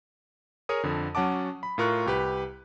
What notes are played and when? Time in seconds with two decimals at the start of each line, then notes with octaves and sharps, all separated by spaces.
0.69 G#4 A#4 C#5 D#6
0.84 F2 D3
1.15 F#3 C#4 F#5 A5 D6
1.63 B5
1.78 A2 F4 A#4 C#6 F#6
2.06 C2 G4 B4